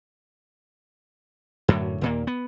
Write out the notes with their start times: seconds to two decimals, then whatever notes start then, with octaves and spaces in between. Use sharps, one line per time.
1.68 F#2 A2 D3 F#3
2.01 D#2 A#2 A#3
2.27 B3